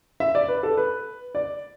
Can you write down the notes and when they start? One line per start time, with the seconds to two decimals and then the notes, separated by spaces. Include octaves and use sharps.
0.20 E5
0.35 D5
0.48 B4
0.63 A4
0.77 B4
1.35 D5